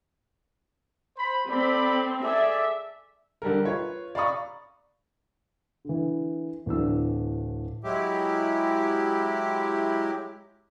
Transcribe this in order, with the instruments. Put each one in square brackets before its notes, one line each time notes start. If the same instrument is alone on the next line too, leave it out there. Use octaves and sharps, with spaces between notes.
[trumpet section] C5 B5
[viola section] C4 [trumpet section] A4 D5 B5
[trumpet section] G#4 A4 D5 [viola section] E5
[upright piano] D3 G3 A4 A#4
F4 B4 C#5
D5 F5 A#5 B5 C#6 D#6
[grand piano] D3 E3
D1 E3 D4 E6
[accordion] F#3 G#3 E4 G4